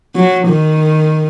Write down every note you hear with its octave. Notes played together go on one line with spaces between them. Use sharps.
F#3
D#3